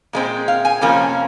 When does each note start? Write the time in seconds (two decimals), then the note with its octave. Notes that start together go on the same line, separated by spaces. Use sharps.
0.13 A#2 G#3 C4
0.48 F5
0.65 G#5
0.81 F2 C3 F3 A#3 C#4